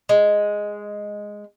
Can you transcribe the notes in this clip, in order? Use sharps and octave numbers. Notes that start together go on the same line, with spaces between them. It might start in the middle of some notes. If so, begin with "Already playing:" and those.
G#3